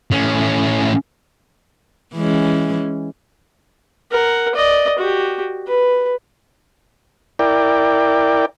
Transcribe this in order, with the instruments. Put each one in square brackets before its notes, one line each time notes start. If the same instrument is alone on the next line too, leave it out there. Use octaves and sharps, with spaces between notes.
[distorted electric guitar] A2 C#4
[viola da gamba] E3 G#3 C#4
[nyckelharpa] A#4 F#5
D5 D#5
F#4 G4
B4
[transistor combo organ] E4 A#4 D5 G5